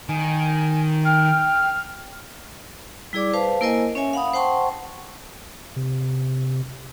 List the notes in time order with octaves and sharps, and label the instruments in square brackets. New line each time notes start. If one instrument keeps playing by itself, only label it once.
[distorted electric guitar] D#3 [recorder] G#5
[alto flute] G5 [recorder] F6
[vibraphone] G3 E4 G#4 D5 D6
B4 C5 F5 A5
A#3 E4 A#4 C5 D#5 G#5
C#4 C#5 E5 G#5
F5 F#5 B5 D#6
C5 F#5 G5 A5 C6 C#6
[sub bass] C3